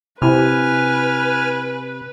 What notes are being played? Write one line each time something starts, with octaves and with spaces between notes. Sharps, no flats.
C3 E4 B4 G#5 B5 F6